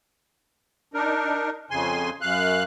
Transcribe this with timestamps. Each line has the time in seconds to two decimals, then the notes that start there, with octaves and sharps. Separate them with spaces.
0.94 D4 D#4 A#4
1.71 F2 C#3 G#5 C6
2.21 F#2 F5 F#6